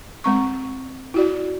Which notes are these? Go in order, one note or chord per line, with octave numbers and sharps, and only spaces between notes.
G#3 C4 C#6
E4 F#4 D5